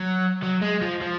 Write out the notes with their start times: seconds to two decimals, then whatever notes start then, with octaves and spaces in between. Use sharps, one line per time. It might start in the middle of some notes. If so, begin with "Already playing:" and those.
Already playing: F#3
0.43 F#3
0.62 G#3
0.82 F3
1.01 F3